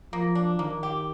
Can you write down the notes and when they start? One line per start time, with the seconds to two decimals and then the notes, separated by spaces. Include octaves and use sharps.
0.13 F3 A#3
0.35 D4
0.59 D#3 A#3
0.83 G4